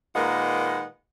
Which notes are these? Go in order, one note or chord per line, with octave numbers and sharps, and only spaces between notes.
A#2 D#3 G#3 A#3 B4 F#5